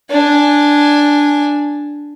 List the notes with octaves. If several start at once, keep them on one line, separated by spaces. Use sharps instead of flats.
D4 G#5